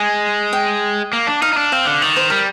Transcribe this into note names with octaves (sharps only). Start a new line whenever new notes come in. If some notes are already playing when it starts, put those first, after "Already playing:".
Already playing: G#3 G#5
G5
A#3
D4
D#4 F5
D#4
D4
C4 F5
D3
D#3 D5
C5
G3 A#4